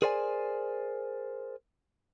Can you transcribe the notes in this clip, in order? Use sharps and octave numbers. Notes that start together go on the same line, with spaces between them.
G#4 A#4 C5 D5 F#5 G#5